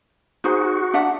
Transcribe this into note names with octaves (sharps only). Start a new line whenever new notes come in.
D#4 F#4 G#4 C5
D4 E5 F#5